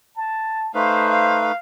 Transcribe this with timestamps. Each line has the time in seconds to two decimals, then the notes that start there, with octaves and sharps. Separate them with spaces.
0.16 A5
0.75 A3 D#4 B4 C5 F5
1.10 F5